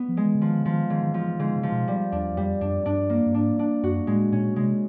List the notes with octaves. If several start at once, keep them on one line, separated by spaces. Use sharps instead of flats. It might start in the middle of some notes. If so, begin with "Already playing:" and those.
Already playing: B3
F3
G#3
E3
D3
D#3 F3
D3
D#3 F3
G#2 D#3
D#3
E3 F3
E3
G#2 D3
C#3
F3
B2
G3
E2 D4
F2 G3
F#2 D4
G2 D4
A#3
G2
G#2 D4
D4
F#2 F#4
A2 G#3
A#2 C#4
C3 G#3